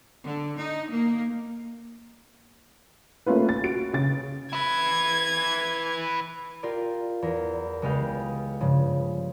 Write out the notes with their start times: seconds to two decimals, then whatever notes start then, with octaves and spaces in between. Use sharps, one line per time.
0.23 D3
0.59 D#4
0.90 A#3
3.26 A3 A#3 C#4 F4 B4
3.49 A6
3.64 F#4 D7
3.93 C#3 A6
4.53 E4 B4 G#6
6.63 F4 G4 A#4 D5
7.22 E2 A#4
7.82 C#2 G#3 B3 G4 F5 G5
8.60 G2 C#3 F3